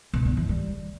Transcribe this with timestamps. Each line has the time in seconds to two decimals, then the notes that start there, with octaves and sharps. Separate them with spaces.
0.13 B2
0.25 D3
0.37 E3
0.49 G3